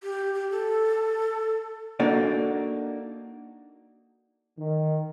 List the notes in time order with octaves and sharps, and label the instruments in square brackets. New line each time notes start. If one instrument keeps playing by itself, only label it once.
[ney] G4
G4
A4
[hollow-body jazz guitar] A#3 D4 D#4 F#4 A4 D5
[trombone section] D#3